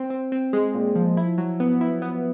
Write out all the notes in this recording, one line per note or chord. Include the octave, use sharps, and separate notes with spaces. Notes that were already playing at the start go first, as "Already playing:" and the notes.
Already playing: C4
C4
C4
G#3
A#2
F3
E4
F#3
B3
E4
B3